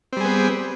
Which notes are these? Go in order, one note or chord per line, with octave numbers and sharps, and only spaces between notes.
G3 B3 C4 G#4